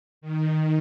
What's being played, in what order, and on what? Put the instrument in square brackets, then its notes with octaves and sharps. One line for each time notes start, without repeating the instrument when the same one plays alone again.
[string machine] D#3